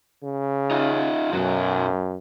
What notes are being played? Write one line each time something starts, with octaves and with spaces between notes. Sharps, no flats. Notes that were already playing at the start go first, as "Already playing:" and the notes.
C#3
D#4 F4
F#2 B2 F#3